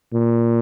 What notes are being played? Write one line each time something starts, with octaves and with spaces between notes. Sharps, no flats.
A#2